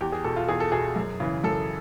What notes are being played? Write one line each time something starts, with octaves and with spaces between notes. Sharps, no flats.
E2 G4
G#4
B2 A4
F4
E2 G#4
A4
B2 G#4
F#2
C#3 E3
F#2 A4